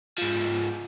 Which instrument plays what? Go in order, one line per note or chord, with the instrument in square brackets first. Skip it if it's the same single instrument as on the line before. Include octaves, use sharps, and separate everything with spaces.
[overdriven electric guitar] G#2 F3